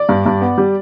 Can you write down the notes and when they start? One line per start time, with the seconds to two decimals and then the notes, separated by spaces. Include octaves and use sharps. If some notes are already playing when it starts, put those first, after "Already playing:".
Already playing: D5
0.09 G2
0.26 G2
0.41 B3
0.58 G3